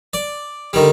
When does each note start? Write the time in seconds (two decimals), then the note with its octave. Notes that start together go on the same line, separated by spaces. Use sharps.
0.13 D5
0.73 D3 D#3 G3